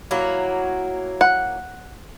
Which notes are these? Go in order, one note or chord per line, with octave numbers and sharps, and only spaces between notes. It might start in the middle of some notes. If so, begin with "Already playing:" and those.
F#3 A#3 E4
F#5